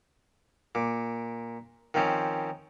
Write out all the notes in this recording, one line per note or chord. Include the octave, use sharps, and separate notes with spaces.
A#2 D6
D#3 F3 C4 C#4